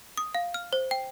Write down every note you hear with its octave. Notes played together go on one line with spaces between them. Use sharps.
D#6
F5
F6
C5
G5